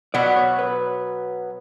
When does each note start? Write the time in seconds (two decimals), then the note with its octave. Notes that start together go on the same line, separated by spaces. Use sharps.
0.14 B2 F#3 B3 D5
0.36 C#5
0.59 B4